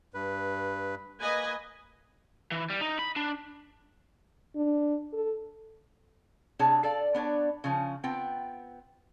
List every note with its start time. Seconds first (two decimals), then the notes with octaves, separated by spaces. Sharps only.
0.14 G2 B4
1.22 A#3 B4 D#5 G#5
2.51 E3
2.70 G3
2.81 D#4
2.99 B5
3.16 D4
4.56 D4
5.13 A4
6.59 C3 D4 G#4 C#5 A5
6.83 A4 D5 F5
7.14 B3 D4 C#5 D5
7.64 C#3 F3 C#4
8.04 B3 C4 F4 G5